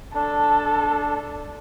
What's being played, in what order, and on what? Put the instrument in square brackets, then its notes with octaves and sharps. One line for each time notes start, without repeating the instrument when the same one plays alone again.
[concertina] D4 [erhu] A4